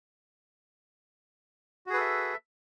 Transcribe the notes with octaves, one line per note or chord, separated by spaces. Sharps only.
F#4 G#4 A4 B4 E5